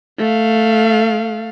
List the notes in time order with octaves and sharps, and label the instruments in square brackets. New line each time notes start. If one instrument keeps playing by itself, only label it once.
[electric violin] A3 F5